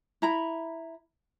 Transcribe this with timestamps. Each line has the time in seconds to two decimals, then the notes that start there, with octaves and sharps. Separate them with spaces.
0.22 E4 A#5 B5